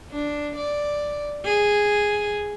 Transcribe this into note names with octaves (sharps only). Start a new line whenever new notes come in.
D4
D5
G#4